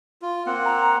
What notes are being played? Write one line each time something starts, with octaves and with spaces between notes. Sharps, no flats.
F4
A#3 C4 F#5
A#5